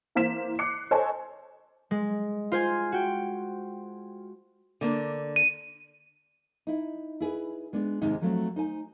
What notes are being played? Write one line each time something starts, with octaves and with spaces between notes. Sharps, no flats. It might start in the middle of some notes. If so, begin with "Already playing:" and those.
E3 A#3 C5 B6 E7
D6 F#6 C7 C#7
A4 C5 C#5 D#5 G#5 A5
G#3
F4 C5 G#5
F#4 G5
D3 A#3 D4
D#7
D#4 E4
E4 G#4 B4
G#3 B3 D4
D#2 G#2 C3 G#3 D#4
F3 F#3 A3 C4
D#4 C5 G#5